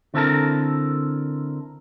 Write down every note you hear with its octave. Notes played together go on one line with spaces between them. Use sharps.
D3 C4 E4 A4 A#4